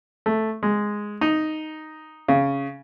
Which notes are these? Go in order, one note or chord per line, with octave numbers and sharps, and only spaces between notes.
A3
G#3
D#4
C#3